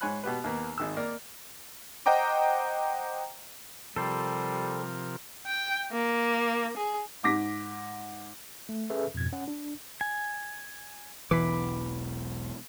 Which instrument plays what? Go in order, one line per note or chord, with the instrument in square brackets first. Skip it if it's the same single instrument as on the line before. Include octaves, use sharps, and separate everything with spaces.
[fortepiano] G#2 C#5 G#5 B5 F#6
B2 B3 G4 B4
D#2 A#3 B3
G#1 D#3 E6
A#3 A#4 D5
[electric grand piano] C5 D#5 F#5 G5 A#5 D6
[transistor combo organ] C3 F3 A#4 [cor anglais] G3 [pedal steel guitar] A4 C5
[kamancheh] G5
A#3
G#4
[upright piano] G#2 D6 A#6 B6
[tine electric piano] A3
C#4 G#4 A4 B4 E5
F2 G#2 B2 G#6
C#4 F#5
D4
[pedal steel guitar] G#5
[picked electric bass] E1 B1 B2 [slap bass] E3 [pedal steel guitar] B5 D6